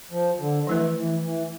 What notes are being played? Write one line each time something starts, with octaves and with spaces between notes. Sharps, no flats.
F3
D3
E3 F3 A3 E4 B4
E3
E3